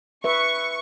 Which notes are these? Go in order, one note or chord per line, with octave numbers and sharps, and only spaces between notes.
B4 E5 C#6